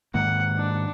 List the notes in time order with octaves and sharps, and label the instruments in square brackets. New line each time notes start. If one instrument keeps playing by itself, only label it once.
[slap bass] G#2 D#3 A#3 [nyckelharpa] F#5
[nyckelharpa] D4